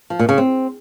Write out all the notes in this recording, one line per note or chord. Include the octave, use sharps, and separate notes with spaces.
F3
A#2
C#3
C4